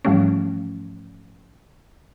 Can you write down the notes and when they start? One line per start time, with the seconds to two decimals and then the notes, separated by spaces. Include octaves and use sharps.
0.05 G#2 E3 F3 G3 A3 C#4